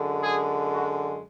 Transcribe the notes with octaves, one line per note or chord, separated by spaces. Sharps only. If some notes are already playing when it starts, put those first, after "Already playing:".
Already playing: F#2 D3 G#3
G#4
F#4